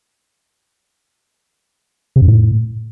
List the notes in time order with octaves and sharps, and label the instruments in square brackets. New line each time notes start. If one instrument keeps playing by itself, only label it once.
[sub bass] C3
F#2
A2